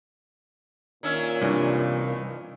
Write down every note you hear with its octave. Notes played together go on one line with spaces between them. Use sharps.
A#2 D#3 C#4 E5
C2 G2 E3 D4